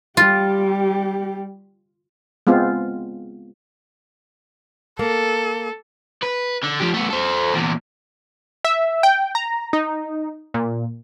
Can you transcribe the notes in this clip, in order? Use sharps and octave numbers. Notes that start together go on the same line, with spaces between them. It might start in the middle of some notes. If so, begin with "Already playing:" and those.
G3 F4 G4
G#3 B3 C4 F4
A#3 A4
B4
D3
F3 G4
A3 B3
A4 C5
E2 A#2
E5
G5
A#5
D#4
A#2